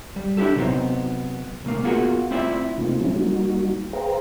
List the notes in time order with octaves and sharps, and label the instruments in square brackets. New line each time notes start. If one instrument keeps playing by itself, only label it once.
[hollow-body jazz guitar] G3
D4 E4 F4 G4 A4
C3 F#3 B3 C4 D#4
C2 A3 A#3
A#3 B3 F4 F#4 G#4 A#4
A3 C4 E4 F4 D5 E5
[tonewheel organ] C3 A3 A#3 C4 D#4 F4
F3 F#3 A3 C#4 D#4 E4
G3 A#3 D#4 F#4
G#4 B4 C5 F5 G5 A#5